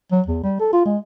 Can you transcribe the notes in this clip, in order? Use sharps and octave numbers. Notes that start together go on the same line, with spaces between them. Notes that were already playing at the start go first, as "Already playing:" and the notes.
F#3
E2
G3
A4
F4
G#3